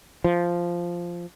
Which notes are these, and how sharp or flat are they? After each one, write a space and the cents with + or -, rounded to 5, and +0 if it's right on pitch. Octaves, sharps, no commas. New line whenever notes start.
F3 -5